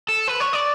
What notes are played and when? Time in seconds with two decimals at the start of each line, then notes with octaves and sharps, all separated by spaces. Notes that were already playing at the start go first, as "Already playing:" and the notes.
0.08 A4
0.28 B4
0.40 C#5
0.53 D5